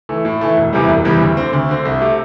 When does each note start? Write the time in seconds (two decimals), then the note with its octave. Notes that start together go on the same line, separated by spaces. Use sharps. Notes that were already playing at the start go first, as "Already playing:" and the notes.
0.09 E3 A3
0.25 A2
0.41 E3 A3
0.57 E1
0.73 E2 C3 E3 G3
0.89 E1
1.05 E2 C3 E3 G3
1.21 D2
1.37 D3 C4
1.53 D2
1.69 D3 C4
1.85 C2
2.01 C3 A3